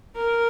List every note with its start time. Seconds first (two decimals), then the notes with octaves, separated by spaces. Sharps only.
0.16 A#4